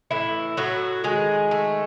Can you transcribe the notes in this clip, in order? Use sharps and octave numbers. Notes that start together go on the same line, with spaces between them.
A2 E3 E4
A2 F#3 F#4
D#3 G#3 G#4
A3